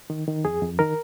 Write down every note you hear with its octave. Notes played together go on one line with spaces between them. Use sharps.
D#3
D#3
F2 G#4
F2
D#3 A#4